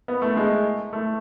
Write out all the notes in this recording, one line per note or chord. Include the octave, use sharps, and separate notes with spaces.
B3
A3
G#3
A3